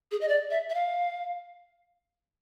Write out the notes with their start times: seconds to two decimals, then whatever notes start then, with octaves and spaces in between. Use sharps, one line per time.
0.12 G#4
0.21 D#5
0.28 D5
0.51 E5
0.70 E5
0.74 F5